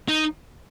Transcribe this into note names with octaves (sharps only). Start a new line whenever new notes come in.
D#4